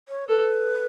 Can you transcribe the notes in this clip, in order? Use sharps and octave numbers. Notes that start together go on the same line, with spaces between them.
C#5
A4 B4